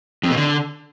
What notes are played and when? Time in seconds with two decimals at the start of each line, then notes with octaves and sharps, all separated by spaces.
0.23 F2
0.30 B2
0.37 D3